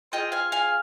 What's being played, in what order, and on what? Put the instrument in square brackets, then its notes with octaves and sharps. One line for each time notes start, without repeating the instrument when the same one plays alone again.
[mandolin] C4 F4 G#4 D#5 G5
F5 G#5
F5 G#5